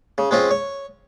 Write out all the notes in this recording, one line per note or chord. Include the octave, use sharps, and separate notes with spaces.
C#3
G#3 C4 C#4 F4
C#5